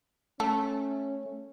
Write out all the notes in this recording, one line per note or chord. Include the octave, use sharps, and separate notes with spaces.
A3 C#4 A4